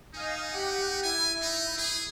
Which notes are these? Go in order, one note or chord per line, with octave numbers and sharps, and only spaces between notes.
D#4 D#5 F5 G#5
G4 F#5
E4 G#5
D#4
G#4